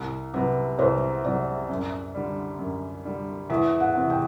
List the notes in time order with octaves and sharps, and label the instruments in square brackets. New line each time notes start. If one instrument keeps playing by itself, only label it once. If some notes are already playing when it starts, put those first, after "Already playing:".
Already playing: [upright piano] C2
[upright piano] C3 F#3 [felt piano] B4
[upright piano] C2 [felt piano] C5
[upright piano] C3 F#3 [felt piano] D5
[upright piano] F#2
D3 G3
F#2
D3 G3
[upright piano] E2 [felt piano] E5
[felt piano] F#5
[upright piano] C3 E3
[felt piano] G5